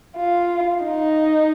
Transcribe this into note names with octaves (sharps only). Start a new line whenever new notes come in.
F4
D#4